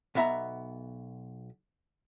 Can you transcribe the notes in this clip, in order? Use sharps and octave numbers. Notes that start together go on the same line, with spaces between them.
B1 B3 E5 A5 A#5